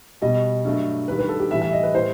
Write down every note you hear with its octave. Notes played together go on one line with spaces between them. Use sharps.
B2 G3 D#5
G2 F#3 A3
G2 D#3 G3 B4
B4
A4
G4
A2 E3 G3 E5
E5
D#5
B4
A2 G3 C5